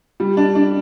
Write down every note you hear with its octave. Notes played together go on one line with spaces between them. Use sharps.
G3
D4
D4